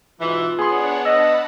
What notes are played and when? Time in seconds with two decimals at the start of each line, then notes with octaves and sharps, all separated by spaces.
0.20 G#2 B2 E3 F4
0.59 B3 D4 G#4 C#5 F#5 C6
1.05 D#5 F#5 A5 B5 E6